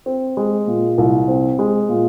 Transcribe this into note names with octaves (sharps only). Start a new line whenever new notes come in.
C4
G#3
A#2
C2
C4
G#3
A#2